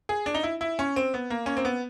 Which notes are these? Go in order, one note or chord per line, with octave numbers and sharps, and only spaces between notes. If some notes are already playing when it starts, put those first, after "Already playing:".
G#4
D4
D#4
E4
E4
C#4
C4
B3
A#3
C#4
C4
B3